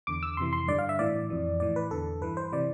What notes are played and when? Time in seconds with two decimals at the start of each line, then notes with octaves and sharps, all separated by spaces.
0.07 E2 D3 D6
0.23 E6
0.37 F2 C3 E3 C6
0.53 C6
0.68 G2 D3 D5
0.79 F5
0.89 E5
0.99 A2 E3 D5
1.30 F2 E3
1.60 A2 E3 D5
1.76 B4
1.91 E2 D3 A4
2.21 G2 E3 B4
2.37 C5
2.52 C3 E3 D5